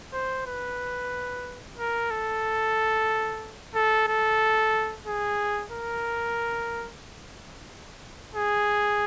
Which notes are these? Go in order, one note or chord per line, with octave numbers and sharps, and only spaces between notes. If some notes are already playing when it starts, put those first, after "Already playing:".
C5
B4
A#4
A4
A4
A4
G#4
A#4
G#4